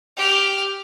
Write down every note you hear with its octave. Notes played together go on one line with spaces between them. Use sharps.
G4 F6